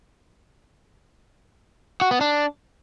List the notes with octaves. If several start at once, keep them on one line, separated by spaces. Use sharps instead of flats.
F#4
B3
D4